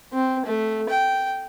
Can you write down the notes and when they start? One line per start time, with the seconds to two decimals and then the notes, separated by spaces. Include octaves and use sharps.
0.13 C4
0.45 A3
0.89 G5